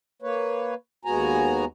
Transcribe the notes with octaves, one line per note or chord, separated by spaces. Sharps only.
A#3 B4 C#5
D#2 G#3 B3 F#4 G#5 A#5